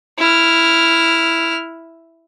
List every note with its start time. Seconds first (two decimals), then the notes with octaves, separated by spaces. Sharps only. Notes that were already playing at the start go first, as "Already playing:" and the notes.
0.19 E4 F6